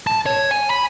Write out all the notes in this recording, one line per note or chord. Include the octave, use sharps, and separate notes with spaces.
A5
C#5
G#5
B5